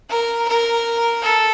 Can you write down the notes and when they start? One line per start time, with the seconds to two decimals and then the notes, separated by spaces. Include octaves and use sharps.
0.10 A#4
0.48 A#4
1.23 A4